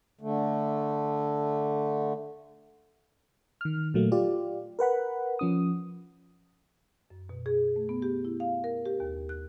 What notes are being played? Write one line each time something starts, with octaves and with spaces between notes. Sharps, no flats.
D3 A3
D#3 F6
A#2 F#3 A3 A#3
F4 G4 D5
A#4 B4 F#5 B5
F3 C#4 D#6
F#2
B2
G#4
A3
B3
G4
E4
F5
A#4
G4
D#2
F#6